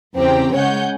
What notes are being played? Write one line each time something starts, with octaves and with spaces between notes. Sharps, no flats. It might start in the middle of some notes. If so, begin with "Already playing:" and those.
E2 C#3 C4 G4 G5 A#5
C#3 G#3 C#5 F#5 G#5 G6